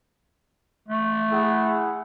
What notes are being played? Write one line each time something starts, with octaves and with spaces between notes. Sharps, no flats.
A3
E4 G#4 F#5